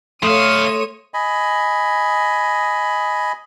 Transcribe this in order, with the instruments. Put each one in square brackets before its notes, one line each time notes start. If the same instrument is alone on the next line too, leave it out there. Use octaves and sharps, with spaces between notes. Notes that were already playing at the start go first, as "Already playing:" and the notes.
[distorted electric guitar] A2 F5 [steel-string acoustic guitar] A3 [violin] C#5 D#7 [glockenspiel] C6 D#6 E7
[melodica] D#5 G#5 B5